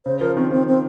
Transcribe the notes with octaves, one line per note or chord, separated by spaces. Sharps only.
C#3 C5
F3 A#4
D#3 C4
F3 C4
C4